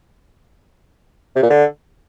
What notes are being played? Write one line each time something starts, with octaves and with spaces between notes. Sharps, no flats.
C3
A#2
D3